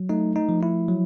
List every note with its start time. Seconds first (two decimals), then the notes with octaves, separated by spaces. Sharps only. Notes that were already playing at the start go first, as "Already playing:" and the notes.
Already playing: F#3
0.09 A3 D#4
0.36 D#4
0.49 F3
0.63 E4
0.88 F#3